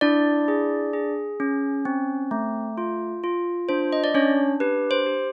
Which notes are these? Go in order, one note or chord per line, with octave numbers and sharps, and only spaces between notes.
D4 E4 D5
G#4
G#4
C#4
C4
A3
F4
F4
D4 C5
D#5
D5
C#4 D4 C#5
G4 B4
C5
G4